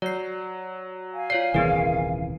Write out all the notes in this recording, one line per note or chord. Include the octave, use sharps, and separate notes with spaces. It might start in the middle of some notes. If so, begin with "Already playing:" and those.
F#3 D5 C7
F5 G#5
F4 C#5 D5 C7
D#1 C2 E3 B3 G#4 A#4